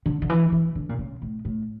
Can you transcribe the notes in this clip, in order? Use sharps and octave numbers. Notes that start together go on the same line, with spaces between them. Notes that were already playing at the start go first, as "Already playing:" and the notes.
D3
D3
E3
E3
D3
A#2
C#3
A2
A2